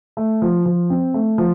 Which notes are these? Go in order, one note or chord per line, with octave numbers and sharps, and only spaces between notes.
A3
F3
F3
C4
A3
F3